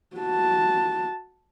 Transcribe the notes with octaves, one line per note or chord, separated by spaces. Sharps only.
F#4 A5